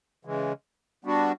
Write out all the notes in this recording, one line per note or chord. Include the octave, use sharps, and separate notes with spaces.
C#3 E3 G#3
G3 B3 D4 F#4